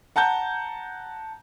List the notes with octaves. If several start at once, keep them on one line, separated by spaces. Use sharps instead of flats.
F#5 A5 A#5 G6